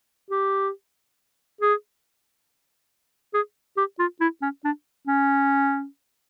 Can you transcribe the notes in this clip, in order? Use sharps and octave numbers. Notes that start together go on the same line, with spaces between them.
G4
G#4
G#4
G4
F4
E4
C#4
D4
C#4